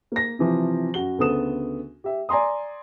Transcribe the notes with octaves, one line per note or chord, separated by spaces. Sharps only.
A#3 A#6
C3 E3 F3
F#2 F#4 G7
D2 C#3 B3 A4 D#6 E7
G4 E5
D5 G#5 A#5 C6 D#6